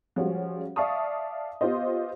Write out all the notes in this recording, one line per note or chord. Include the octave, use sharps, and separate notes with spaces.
F3 G3 G#3 C#4 F#4
D5 E5 F5 A5 C#6 D#6
B3 F4 G4 C5 D#5